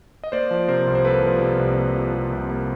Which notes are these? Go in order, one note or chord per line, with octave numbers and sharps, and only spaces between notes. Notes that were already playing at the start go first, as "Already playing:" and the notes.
D#5
A#3 C5 D5
F3
C3 A#4 C5
C2
C5
A#3 A4 B4
F3
C3
C2
A#3
F3
C3
C2
A#3